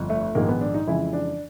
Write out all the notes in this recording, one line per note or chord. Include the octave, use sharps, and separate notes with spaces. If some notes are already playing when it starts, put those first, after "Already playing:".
Already playing: G1 F2
A3
A#1 G#2 D#3 G#3 A#3
B3
D4
D#4
F2 C#3 E3 G#3 E4
D4